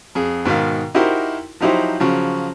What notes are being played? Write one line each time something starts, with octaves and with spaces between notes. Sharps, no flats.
F2 G#4
G#2 B2 D#3 F5
D#4 E4 F#4 G4 A#4 C5
F3 F#3 D#4 E4 G4 C5
C#3 F3 F#3